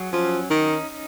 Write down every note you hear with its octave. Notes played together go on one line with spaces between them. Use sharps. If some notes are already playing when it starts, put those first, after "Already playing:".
Already playing: F#3 G#4
F3 C#4
D#3 D#4